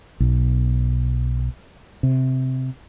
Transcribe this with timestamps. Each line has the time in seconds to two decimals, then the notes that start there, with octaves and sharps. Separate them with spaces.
0.20 B1
2.03 C3